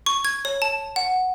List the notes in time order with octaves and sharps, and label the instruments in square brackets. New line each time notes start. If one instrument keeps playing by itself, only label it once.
[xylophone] C#6
G#6
C#5
A5
F#5